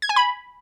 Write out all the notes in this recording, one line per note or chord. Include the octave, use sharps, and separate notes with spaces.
G#6
G#5
B5